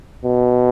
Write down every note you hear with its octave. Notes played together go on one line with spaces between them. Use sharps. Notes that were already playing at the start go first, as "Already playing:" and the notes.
B2